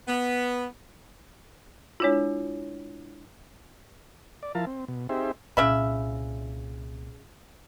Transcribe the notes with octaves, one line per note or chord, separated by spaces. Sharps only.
B3
G#3 D4 E4 F4 C#5
D5
F3 E4 A#4 F5 A5
C4
B2
C4 D#4 G4 G#4 C5 E5
C2 A#2 C#3 E5 B5